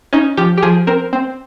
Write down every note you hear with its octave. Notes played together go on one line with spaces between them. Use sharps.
C#4 D#4
F3 G4
G4
F3 G#4
C4 A#4
C4